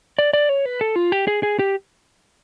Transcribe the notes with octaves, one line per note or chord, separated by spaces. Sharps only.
D5
D5
C#5
B4
A4
F4
G4
G#4
G#4
G4